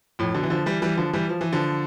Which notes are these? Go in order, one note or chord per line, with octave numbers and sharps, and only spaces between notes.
F2 A2
B2 D3
E3
D3 F3
E3 G3
E3 G3
D3 F3
E3 G3
F3
E3
D3 F3